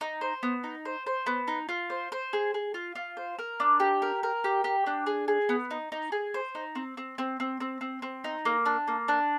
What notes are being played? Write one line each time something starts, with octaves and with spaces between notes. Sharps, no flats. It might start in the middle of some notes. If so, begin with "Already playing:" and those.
D#4
C5
B3
D#4
C5
C5
B3
D#4
F4
C5
C5
G#4
G#4
F4
F4
C5
A#4
D4
G4
A#4
A#4
G4
G4
D4
G#4
G#4
B3
D#4
D#4
G#4
C5
D#4
C4
C4
C4
C4
C4
C4
C4
D#4
A#3
D4
A#3
D4